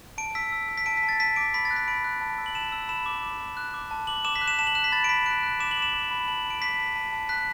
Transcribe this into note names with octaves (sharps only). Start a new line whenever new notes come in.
A5 D7
E6 B6
E6
E6
B6
A5 D7
B6
A5
A6
A5 B6
D6 D7
B5 B6
A6
F#6
B6
B5 D7
F#6
A5
E6
F#7
A5 E7
E6
B5 E7
D6
D6
D6
F#6
D6
A5
D6 F#7
D6 E7
B6
F#6
E7
A5 E7
F#7
F#6 E7
B6
B5 A6
D7
B5 B6
F#6 D7
F#6
D6 E7
F#7
D6 E7
D6
B5
A5 F#7
A5
D7
D6 B6
A5
A5
A5
F#6 B6